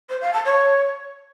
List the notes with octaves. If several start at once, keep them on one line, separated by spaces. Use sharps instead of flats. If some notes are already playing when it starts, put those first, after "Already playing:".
C5
F5
A5
C#5